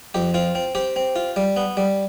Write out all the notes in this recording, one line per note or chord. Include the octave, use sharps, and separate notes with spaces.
F2 G4
C4 F4
C4
C4 G4
C4
F4
G3
B3
G3